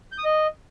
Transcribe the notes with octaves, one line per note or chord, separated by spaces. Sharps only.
G6
D#6
D#5